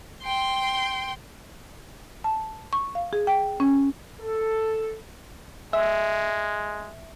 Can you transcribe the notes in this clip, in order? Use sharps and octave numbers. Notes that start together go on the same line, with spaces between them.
G5 C6
A5
C#6
F5
G#4
G5
C#4
A4
G#3 E5